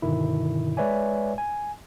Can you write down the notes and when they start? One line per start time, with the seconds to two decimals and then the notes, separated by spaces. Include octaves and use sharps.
0.02 G2 B2 D3 D#3 E4
0.77 G#3 B4 C#5 D5 E5 G#5
1.38 G#5